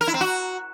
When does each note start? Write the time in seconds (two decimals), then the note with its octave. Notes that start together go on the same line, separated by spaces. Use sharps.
0.01 A#4
0.07 E4
0.14 C4
0.21 F#4